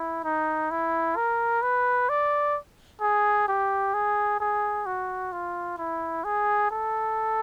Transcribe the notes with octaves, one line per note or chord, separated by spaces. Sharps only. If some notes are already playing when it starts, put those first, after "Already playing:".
Already playing: E4
D#4
E4
A#4
B4
D5
G#4
G4
G#4
G#4
F#4
F4
E4
G#4
A4